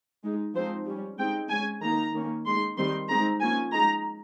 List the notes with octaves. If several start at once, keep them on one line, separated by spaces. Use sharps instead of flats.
G#3 D#4
F3 G#3 C4 D#4 C5
G3 C#4
G#3 C4 D#4 G5
G#3 C#4 G#5
D#3 A#3 D#4 A#5
D#3 A#3 C#4
G#3 D#4 C6
D#3 G3 C4 D#4 C6
G#3 C4 D#4 A#5
F3 A#3 C#4 G#5
G#3 D#4 A#5